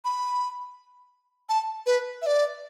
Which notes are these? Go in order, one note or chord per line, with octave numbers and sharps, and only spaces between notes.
B5
A5
B4
E5
D5